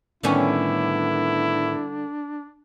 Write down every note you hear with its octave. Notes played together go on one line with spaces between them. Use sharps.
A2 D3 D#3 G3 B3 C#4 D4 E4